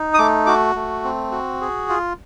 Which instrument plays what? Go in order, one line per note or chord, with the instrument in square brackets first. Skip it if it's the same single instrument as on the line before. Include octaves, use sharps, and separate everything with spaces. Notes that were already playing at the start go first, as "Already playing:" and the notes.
Already playing: [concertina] D#4
D#6
A3 D6
F#4 D6
A3
C4
F#4
G#4
F4